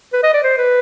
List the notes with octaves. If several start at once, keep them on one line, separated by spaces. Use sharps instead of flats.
B4
D#5
D5
C5
B4